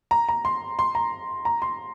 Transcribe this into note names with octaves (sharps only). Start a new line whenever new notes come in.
A#5
A#5
C6
C6
A#5
A#5
C6